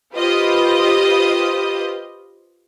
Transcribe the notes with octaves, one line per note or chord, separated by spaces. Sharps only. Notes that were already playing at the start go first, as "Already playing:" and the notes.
F4 G4 B4 C5 D#5 D#6